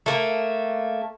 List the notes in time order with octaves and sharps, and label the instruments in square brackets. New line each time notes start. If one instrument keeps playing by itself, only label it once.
[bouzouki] A3 A#3